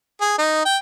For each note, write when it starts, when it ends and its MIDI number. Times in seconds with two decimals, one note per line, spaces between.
0.20 0.37 68
0.38 0.63 63
0.65 0.77 79